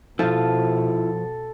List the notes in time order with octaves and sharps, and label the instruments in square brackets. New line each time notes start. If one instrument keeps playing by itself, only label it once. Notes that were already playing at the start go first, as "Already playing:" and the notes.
[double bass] B2 [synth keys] F3 [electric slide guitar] E4 F4 [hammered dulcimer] A4